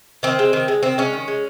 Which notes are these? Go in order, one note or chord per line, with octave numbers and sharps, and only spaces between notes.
D#3 C4
G#3
D#3
G#3
D#3 C4
G#3 C#4
D#3
G#3